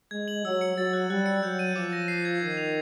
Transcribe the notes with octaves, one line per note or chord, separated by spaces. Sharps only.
G#3 G#6
F#7
F#3 E6
C#7
F#3 A6
F#6
G3 F#6
C#7
F#3 G6
D#7
F3 D6
A#6
C7
G#6
D#3 G#6
F7